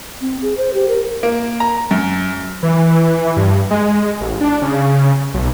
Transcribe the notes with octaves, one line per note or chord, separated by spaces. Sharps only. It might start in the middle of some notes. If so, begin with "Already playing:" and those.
C4
G#4
C5
G4
A#4
A#3
A#5
F#2
E3
G2
G#3
A1
D4
C#3
B1